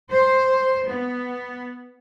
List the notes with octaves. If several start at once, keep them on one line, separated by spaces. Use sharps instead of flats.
C5
B3